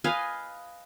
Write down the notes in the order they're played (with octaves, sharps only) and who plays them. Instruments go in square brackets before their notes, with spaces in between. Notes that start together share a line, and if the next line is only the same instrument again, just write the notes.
[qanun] B4 D#5 F5 G#5